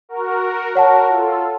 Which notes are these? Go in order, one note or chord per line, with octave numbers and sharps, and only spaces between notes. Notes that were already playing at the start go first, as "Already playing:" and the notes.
F#4 A#4
F#4 A#4 C#5 F#5 A5
F4 A4